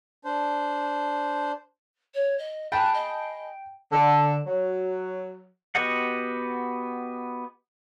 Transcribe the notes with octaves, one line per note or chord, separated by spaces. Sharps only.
D4 C5
C#5
D#5
G#4 G5 A5 B5 F#6
D#5
D3
F#3
B3 F#4 G4 D#5 F#5